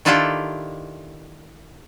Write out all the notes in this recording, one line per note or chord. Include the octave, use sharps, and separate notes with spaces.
D#3 D4 E4 F4 G4 A4